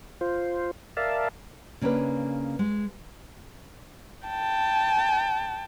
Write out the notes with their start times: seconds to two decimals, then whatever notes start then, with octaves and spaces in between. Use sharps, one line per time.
0.21 F4 C5
0.97 A#4 D5 E5 F5 A5
1.81 C#3 A#3 C#4 D4 B4
2.59 G#3
4.28 G5 A5